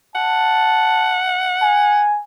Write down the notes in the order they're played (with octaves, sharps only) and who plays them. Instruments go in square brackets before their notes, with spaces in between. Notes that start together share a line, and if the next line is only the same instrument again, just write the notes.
[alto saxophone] F#5 [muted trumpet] A5
[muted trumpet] G#5